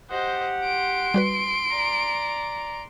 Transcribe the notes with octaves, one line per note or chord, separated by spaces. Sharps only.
G4 C5 D#5 F#5
C6 D7
G3 F#4 B4
D5 A#5